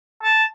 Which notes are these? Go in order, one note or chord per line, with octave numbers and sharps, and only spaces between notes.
A5